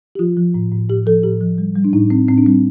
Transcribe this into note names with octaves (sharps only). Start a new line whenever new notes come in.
G4
F3 F4
F3
A2
A2
A2 G4
F3 A4
A2 G4
F3
G3
G3
D4
A2 D#4
A2 C4
A2 C4
D4
G3 C4